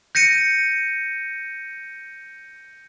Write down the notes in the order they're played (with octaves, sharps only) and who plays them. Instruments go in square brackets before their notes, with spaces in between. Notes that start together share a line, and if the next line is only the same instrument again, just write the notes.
[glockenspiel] G6 A#6 C#7 D#7